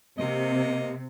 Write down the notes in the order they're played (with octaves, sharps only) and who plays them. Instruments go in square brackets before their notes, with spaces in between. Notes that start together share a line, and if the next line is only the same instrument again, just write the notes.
[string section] C3 [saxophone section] A#3 D#5